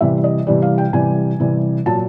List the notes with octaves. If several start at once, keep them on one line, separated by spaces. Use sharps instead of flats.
C3 E3 G3 E5
D#5
C3 E3 G3 D5
F5
G5
C3 E3 G3 G#5
C3 E3 G3
A#2 F#3 A5